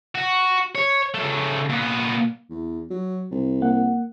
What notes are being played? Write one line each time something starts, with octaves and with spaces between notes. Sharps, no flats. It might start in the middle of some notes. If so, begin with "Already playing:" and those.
F#4
C#5
C#3 A3
A#2 B3
E2
F#3
C2
A#3 F#5